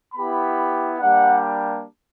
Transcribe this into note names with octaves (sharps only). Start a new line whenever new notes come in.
B3 E4 G4 B5
G3 A#3 D4 G4 F#5